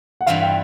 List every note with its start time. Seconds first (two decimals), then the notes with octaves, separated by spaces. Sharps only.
0.21 F#5
0.27 G2 E3 G3 C4 F4 F5
0.43 G5